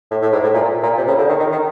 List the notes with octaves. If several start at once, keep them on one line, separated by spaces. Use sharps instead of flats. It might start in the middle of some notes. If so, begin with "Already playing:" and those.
A2
A2
G#2
A2
A#2
A#2
C3
C#3
D3
D#3
D#3
D#3